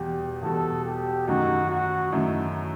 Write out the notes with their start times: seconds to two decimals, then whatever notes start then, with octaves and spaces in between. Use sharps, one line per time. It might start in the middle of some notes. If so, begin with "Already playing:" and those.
Already playing: E2 B2 G3 G4
0.42 E2 B2 G3 A4
0.85 G4
1.28 F#2 D#3 A3 D#4 F#4
1.70 F#4
2.12 F#2 D#3 A3 D#4 E4